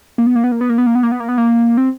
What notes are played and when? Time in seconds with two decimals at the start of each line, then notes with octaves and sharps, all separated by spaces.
0.18 A#3
0.27 B3
0.35 A#3
0.44 B3
0.52 A#3
0.61 B3
0.69 A#3
0.78 B3
0.86 A#3
0.95 B3
1.03 A#3
1.12 B3
1.20 A#3
1.29 B3
1.38 A#3
1.77 C4